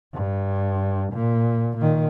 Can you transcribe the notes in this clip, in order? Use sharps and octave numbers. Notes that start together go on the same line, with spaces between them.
G2
A#2
A#2 D#3